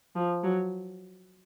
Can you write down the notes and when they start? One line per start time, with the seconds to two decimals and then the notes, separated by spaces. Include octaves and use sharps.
0.16 F3
0.44 F#3